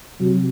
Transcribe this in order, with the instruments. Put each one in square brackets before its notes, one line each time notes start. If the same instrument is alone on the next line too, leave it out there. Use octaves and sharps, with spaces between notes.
[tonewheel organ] C3 [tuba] F#3